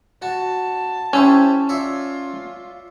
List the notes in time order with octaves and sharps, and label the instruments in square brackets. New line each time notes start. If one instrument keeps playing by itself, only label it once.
[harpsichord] F#4 [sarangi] A5
[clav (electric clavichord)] C#4 G#5 [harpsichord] E4 G4 C5
[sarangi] F4 [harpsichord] C#5 D5 E5